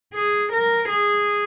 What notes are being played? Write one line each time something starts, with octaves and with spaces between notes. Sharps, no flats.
G#4
A#4
G#4